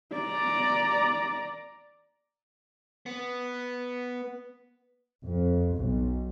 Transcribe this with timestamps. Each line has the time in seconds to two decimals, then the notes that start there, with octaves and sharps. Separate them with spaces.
0.14 D5 A#5
3.06 B3
5.23 F2
5.75 B1